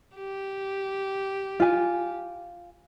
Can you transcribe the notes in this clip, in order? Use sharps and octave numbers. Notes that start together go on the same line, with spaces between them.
G4
F4 G#5